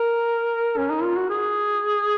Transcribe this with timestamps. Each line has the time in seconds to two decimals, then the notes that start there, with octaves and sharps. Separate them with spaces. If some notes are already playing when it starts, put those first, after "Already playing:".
Already playing: A#4
0.77 C#4
0.90 D#4
1.03 F4
1.16 F#4
1.29 G#4